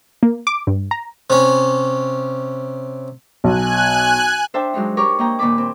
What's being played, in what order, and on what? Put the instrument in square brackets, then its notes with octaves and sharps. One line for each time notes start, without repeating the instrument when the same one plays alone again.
[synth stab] A#3
D6
G2
A#5
[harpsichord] C3 C#4
[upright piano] B1 [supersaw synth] G#5 F#6
[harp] D4 C5 E5 G5 A5
F#3 G#3 D4 D#4
G4 A#4 C#5 C#6 D6
A#3 D#5 G5 A#5
A#2 D#3 A#3 A5 B5 D6
C4